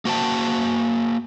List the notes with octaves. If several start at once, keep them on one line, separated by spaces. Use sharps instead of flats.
A#3 F#4 C5 G5 A5